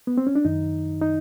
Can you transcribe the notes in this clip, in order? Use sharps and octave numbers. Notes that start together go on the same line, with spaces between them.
B3
C4
C#4
D4
F#2 D#3 D#4
D#4